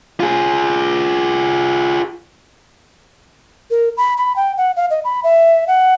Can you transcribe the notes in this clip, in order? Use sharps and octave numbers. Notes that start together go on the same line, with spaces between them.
F4 G#4
A#4
B5
B5
G5
F#5
F5
D#5
B5
E5
F#5